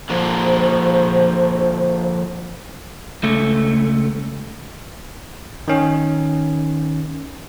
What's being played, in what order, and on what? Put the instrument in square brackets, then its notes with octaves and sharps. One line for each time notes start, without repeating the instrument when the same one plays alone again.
[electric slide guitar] D3 F3 A#3 [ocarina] C5
[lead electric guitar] C#2 A3
[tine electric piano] D#3 C#4